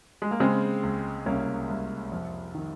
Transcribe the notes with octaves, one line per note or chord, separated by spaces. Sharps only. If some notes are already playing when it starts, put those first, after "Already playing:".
G#3
A#3
C#3 G#3 C4
C#2
C2 A#3 C#4
C2
F2
D#3